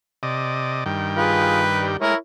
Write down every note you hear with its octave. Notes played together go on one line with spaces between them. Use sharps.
C3 D5 D#5
G2 D#3 G5
F4 G#4 B4
G3
G#3 E4 A#4 C#5